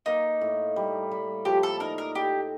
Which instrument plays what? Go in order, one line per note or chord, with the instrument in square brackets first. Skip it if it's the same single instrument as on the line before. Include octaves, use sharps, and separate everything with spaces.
[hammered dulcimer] A#3 [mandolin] D#4
[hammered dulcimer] A2
G3
G3
[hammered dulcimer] F3 [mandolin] G4
[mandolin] A4
[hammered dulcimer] D#4 [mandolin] A#4
[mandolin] A#4
[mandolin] G4 [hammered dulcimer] A4